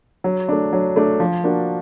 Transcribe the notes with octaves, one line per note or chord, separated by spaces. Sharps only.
F#3
A3 D4
F#3
A3 D4
F3
A#3 D4 F#4